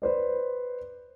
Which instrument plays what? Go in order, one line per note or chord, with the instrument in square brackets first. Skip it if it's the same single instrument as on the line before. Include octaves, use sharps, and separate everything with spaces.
[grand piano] B4 C5 D5